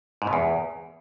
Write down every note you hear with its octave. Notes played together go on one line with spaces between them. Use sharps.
G#2
B2
E2